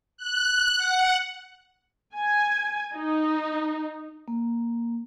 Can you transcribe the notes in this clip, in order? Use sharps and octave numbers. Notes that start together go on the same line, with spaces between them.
F#6
F#5
G#5
D#4
A#3